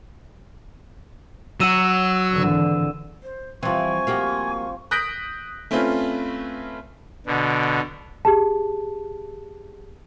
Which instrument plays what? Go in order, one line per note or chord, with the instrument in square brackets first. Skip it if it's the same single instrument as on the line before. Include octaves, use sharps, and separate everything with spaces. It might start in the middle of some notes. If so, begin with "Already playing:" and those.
[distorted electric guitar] F#3 F#4 [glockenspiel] E6 D#7 E7
[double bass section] G#1 D3 E3
[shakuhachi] C5
[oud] E3 G3 [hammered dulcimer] F3 C4 [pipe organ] G#5 [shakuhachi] C#6
[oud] A#3 F#4 G4
[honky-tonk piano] D#6 F#6 G6 A#6 B6 D7
A3 C4 C#4 F4 B4
[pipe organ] B2 D3
[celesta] G4 G#4 A5